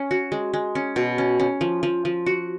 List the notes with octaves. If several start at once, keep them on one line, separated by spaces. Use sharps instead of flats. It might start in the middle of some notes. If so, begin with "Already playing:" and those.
Already playing: C#4
F#4
G#3
G#3
C#4
B2
C#4
C#4
F3
F3
F3
F#4